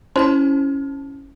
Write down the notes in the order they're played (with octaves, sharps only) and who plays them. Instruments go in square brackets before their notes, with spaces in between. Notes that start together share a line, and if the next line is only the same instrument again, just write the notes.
[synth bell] C#4 E4 A5 [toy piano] C5 C#5 C6